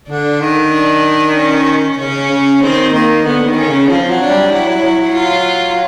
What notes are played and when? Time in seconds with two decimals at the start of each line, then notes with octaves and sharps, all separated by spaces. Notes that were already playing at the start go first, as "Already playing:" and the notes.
0.10 D3 D4
0.41 D#3
0.73 D4
1.36 C#4
1.99 C#3 C#4
2.31 C#3
2.63 D#3 C4
2.94 D#3 A#3
3.26 D3 B3
3.47 D#3
3.57 C#4
3.68 C#3
3.89 F3 C4
4.10 F#3
4.21 D4
4.31 G3
4.52 F#3 E4
4.68 F#3
4.84 F#3
5.00 F#3
5.15 F4